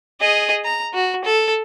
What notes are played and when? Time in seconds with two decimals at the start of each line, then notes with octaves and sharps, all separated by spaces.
0.20 G#4 D#5
0.65 A#5
0.94 F#4
1.25 A4